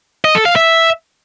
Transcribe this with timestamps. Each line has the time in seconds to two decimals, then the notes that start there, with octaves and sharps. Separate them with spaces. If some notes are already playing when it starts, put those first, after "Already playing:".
0.24 D#5
0.35 A4
0.45 F5
0.56 E5